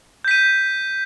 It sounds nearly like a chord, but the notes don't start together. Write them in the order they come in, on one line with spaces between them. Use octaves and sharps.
G6 B6 D#7